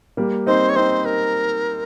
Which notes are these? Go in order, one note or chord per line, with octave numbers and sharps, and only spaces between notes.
G3 A#3
C4 D#4 C5
C#5
C4 D#4 C5
A#4